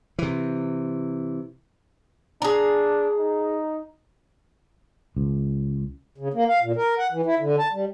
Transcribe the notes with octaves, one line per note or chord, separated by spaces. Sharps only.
C3 E3
D4 G#4 A#5
D#4
C#2
C#3
A#3
F5
A#2
A#4
F#5
E3
E4
D3
A5
G3